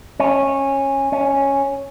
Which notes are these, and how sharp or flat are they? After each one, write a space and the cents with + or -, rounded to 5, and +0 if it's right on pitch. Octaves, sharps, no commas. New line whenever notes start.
C#4 -15
C#4 -5